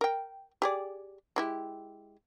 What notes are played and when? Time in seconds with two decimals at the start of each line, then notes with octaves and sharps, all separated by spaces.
0.01 A#4 G5
0.62 G4 G#4 D5
1.36 G#3 E4 G4